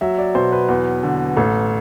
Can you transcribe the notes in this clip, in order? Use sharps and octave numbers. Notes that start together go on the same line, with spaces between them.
F#3 E5
D5
B2 C5
B4
E2
D3
A1 A4